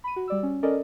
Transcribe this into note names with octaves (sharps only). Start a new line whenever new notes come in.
B5 D#7
F#4
G3 D5 E6
C#4
C#4 A4 A#4 D5 D#5